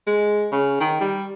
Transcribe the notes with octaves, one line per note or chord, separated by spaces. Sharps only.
G#3
C#3
D#3
G3